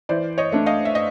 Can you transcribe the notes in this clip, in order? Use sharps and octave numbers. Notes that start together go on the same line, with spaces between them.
E3 C5 D5
C#5 D#5
A3 D4
D#5 F5
E5
D#5